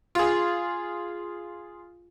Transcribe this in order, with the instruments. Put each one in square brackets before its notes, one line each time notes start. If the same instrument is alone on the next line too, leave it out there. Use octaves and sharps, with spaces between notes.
[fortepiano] F4 G#4